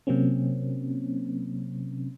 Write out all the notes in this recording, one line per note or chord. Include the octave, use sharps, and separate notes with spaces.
C3 F#3 A#3 C4 C#4